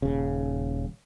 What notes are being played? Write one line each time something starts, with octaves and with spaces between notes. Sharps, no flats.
D#1 C#3